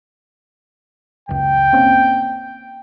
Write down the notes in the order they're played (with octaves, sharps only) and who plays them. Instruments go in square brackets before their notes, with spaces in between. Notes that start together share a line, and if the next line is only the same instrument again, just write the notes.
[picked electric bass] F#1 C#2 [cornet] G5
[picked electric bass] A#3 C4 C#4